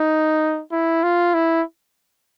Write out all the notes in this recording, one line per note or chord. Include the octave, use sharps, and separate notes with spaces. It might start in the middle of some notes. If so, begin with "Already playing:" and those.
Already playing: D#4
E4
F4
E4